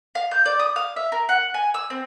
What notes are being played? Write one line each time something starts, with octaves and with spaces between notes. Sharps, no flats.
F5
G6
D5
D#6
F5
E5
A#4
F#5
G#5
E6
C4